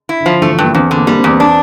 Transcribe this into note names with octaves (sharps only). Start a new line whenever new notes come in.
E4
D3
F3
D3
E3 A3
F3
G2
A#3
E2 C4
D3
A#3
G3 A#3
C4
E2
C4
D4